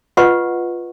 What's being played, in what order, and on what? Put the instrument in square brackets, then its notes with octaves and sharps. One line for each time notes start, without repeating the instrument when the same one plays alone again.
[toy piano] F4 B4 D#5 F#5 C#6